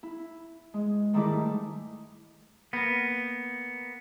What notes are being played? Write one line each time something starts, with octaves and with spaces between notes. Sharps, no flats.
E4
G#3
G#2 D#3 G3 A3 E4 D6
A#3 B3